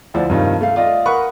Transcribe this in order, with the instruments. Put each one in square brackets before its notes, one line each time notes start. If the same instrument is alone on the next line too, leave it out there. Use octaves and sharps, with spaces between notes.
[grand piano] D2 F3 E4 D5
G2 C3 D#3 F3 G3 F4
A3 F5
F4 D5 D#5
A#4 B4 F#5 B5 C#6 D#6